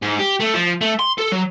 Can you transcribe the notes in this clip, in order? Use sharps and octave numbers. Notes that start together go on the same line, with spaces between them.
G#2
G4
A3
F3
A3
C6
A4
F#3